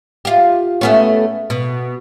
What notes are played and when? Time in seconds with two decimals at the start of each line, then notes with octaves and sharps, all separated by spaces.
0.25 F4 G4
0.81 A3 B3 C#4
1.50 B2